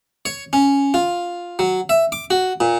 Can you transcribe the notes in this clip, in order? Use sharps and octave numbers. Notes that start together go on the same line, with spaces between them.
C#5
C#4
F4
F#3
E5
D6
F#4
A#2